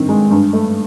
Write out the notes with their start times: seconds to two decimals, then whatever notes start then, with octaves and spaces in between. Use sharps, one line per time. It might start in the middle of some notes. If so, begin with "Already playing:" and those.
Already playing: G2 D#3 C4
0.09 G#3
0.31 G2
0.53 A3